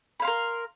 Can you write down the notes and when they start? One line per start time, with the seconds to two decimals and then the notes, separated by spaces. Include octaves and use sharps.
0.20 B5
0.22 F5
0.25 C6
0.27 A#4